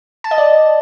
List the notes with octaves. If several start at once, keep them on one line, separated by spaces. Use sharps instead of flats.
A5
D#5
D5